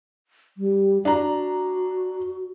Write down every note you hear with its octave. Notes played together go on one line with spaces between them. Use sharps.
G3
D4 F#4 A#5